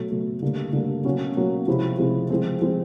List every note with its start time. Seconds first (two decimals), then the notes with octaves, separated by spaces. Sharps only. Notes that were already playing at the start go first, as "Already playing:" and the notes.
Already playing: B2 F#3 A3
0.10 B2 F#3 A3
0.42 D3 G3 A#3
0.73 D3 G3 A#3
1.05 B2 F#3 A#3 C#4 F#4
1.36 B2 F#3 A#3 C#4 F#4
1.67 C3 F3 G#3 C4 E4
1.98 C3 F3 G#3 C4 E4
2.30 F3 G#3 C4
2.61 F3 G#3 C4